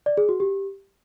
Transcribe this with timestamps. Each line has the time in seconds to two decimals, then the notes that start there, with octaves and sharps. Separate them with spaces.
0.06 D5
0.17 G#4
0.29 F#4
0.40 G4